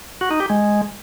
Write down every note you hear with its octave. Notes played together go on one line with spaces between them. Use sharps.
F#4
D#4
G4
G#3